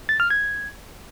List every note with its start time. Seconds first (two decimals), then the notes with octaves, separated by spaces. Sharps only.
0.09 A6
0.20 F6
0.30 G#6